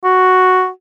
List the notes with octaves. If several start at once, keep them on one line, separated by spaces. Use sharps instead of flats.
F#4